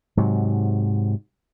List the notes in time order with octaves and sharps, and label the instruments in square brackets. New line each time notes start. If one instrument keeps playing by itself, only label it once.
[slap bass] G#2 C3 F#3